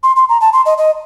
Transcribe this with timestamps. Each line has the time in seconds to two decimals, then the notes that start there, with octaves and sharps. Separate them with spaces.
0.03 C6
0.16 C6
0.29 A#5
0.41 A5
0.53 C6
0.66 D#5
0.78 D#5